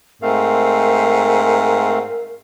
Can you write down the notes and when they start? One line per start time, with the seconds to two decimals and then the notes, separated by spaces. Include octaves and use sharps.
0.22 G#2 A3 C4 A#4 F5